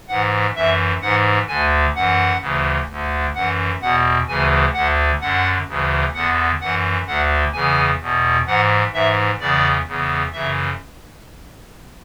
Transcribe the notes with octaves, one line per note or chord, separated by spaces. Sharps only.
G#2 E3 F#5
F#2 E3 E5
G#2 E3 F#5
D2 D3 G#5
F#2 E3 F#5
D2 C#3 E3
D2 D3
F#2 E3 F#5
E2 B2 F#5
D2 C#3 E3 G#5
D2 D3 F#5
F#2 D3 F#5
D2 C#3 E3
E2 D3 F#5
F#2 E3 F#5
D2 D3 F#5
E2 C#3 E3 G#5
E2 B2
G#2 E3 F#5
G#2 E3 E5
E2 C#3 E3 D5
E2 C#3 E3
F#2 C#3 E3 E5